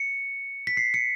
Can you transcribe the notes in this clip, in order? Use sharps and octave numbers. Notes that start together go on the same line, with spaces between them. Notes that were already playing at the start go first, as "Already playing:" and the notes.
Already playing: C#7
B6
C7
C#7